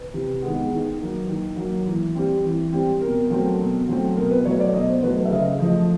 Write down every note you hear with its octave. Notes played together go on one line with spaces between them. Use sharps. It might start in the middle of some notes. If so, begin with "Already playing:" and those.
Already playing: B4
C3
D#3 G#3 B3
D#3
F#3 A#3
D#3
F#3 A#3
E3
G3 C4
E3
G3 C4
B2 A#4
F#3 A3 C4
B2
F#3 A3 C4
B2 A#4
B4
F#3 A3 C#5
D5
B2 D#5
C5
F#3 A3 B4
B4
E5
C#3 D#5
F3 A3 D#5